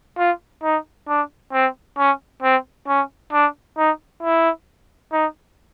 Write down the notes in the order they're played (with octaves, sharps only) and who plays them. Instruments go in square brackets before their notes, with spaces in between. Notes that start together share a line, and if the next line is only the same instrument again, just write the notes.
[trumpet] F4
D#4
D4
C4
C#4
C4
C#4
D4
D#4
E4
D#4